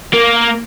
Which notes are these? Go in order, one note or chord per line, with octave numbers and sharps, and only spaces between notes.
A#3